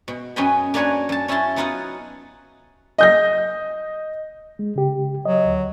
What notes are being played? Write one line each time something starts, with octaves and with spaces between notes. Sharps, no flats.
B2
F#2 C#4 B4 D#5 G5 B5
A#3 D4 B4 C#5 G#5 A#5
F#2 A5
C#4 E4 F#4 G#5 A5 C6
F#3 B3 D#4 F4 D#5 F#5
D#5 G6 A#6
G#3
C#3 G4
F#3 D#5
D2